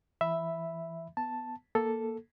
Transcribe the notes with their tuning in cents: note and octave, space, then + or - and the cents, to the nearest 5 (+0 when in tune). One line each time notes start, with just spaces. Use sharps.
E3 +15 E5 +0 B5 +0
B3 +5 A5 +0
A#3 +5 A4 +0